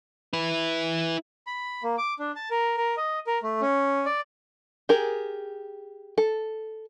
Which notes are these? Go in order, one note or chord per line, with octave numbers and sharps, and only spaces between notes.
E4 B4
B5
A#3
D6
D4
A5
A#4
A#4
D#5
A#4
A3
C#4
D5
G4 G#4 A#4
A4